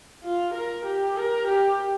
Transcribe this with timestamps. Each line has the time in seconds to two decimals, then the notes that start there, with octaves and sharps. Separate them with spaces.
0.24 F4
0.54 A#4
0.85 G4
1.17 A#4
1.47 G4